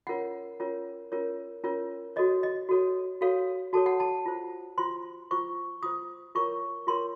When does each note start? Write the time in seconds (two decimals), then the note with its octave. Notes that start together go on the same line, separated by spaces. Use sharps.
0.07 C#4 F4 A#4 C#5 F#5
0.60 C#4 F4 A#4 C#5
1.12 C#4 F4 A#4 C#5
1.64 C#4 F4 A#4 C#5
2.16 F#4 A4 C#5 D#5
2.43 D#5
2.69 F#4 A4 C#5
3.21 F#4 A4 C#5 F5
3.73 F#4 A4 C#5 A5
3.86 F#5
4.00 A5
4.26 F4 C5
4.78 F4 C5 C6
5.31 F4 C5 C#6
5.83 F4 C5 D#6
6.35 F4 A#4 C#5 C#6
6.87 F4 A#4 C#5 C6